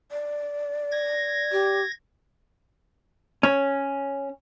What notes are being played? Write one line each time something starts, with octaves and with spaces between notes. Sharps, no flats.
D5
G#6 A#6
G4
C#4